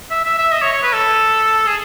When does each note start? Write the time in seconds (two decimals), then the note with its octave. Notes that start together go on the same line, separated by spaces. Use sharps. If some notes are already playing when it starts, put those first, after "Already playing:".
0.11 E5
0.25 E5
0.38 E5
0.52 D#5
0.62 C#5
0.73 C#5
0.83 B4
0.93 A4
1.67 G#4